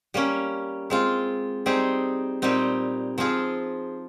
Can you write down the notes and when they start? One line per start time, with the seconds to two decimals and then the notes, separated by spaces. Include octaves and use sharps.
0.14 G3 A#3 C#4
0.90 G#3 C4 F4
1.66 G3 C4 D#4 G#4
2.42 A#2 G3 C4 D#4
3.18 F3 C4 F4 G#4